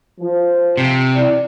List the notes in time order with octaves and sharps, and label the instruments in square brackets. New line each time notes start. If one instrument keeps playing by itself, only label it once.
[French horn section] F3
[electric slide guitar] C3
[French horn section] E3 E4 D5